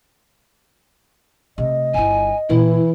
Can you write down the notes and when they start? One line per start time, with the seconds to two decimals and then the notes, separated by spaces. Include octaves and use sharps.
1.58 C3 A3 D#5
1.94 G1 E4 G#5
2.50 A#2 E3 E4